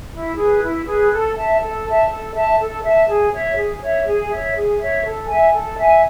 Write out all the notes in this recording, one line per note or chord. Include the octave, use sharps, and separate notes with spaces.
E4
G#4 B4
E4
G#4 B4
A4
E5 A5
A4
E5 A5
A4
E5 A5
A4
E5 A5
G#4
C#5 E5
G#4
C#5 E5
G#4
C#5 E5
G#4
C#5 E5
A4
E5 G#5
A4
E5 G#5